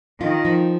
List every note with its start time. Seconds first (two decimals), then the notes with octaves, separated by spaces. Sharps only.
0.20 D#3 F4
0.45 F3